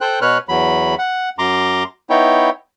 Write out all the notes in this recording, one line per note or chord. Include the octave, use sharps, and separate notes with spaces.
A4 C5 G5 F#6
B2 B4 C#5 F6 F#6
E2 F#3 B5
F#5
F#2 A#5 C6 D6
B3 D#4 E4 C#5 G5